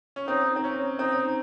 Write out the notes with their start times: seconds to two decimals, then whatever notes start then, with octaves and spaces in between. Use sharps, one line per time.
0.16 C#4
0.28 C4 D#4
0.56 C4
0.64 C#4
0.99 C4 D#4